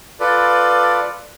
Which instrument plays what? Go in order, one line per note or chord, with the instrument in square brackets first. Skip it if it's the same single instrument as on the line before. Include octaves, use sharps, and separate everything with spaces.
[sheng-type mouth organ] F4 A4 B4 D5